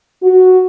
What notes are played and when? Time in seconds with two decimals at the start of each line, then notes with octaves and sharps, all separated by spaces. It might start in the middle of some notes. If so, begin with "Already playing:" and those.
0.22 F#4